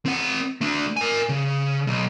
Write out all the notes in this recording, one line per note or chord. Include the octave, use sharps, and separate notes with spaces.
C4 F#5
A3 D4
A#4 G#5
C#3
B1